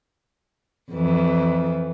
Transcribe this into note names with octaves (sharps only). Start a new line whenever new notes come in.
F2 E3